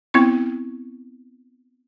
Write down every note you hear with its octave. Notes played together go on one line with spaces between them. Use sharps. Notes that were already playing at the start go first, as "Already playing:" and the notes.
B3 C4 E4 C#6